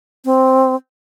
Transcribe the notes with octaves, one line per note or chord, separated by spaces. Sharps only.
C4